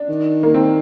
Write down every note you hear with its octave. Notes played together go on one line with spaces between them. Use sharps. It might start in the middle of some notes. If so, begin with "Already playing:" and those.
Already playing: D4
D#3
A#3
C4